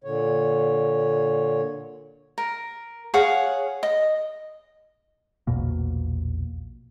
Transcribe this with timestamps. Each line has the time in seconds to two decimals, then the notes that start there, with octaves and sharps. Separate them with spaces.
0.04 A#2 D3 C#5
2.38 A#4
3.14 G#4 C#5 F5 F#5
3.83 D#5
5.47 A#1 E2 B2 A#3